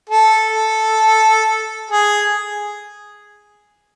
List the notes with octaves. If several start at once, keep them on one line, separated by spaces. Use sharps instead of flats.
A4
G#4